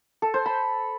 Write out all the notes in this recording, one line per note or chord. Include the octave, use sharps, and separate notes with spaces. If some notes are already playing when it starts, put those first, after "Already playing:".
A4
C5
B5